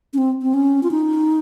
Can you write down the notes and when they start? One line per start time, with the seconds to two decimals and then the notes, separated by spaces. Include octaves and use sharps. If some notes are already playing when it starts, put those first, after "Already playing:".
0.13 C#4
0.18 C4
0.42 C4
0.54 C#4
0.83 F4
0.91 D#4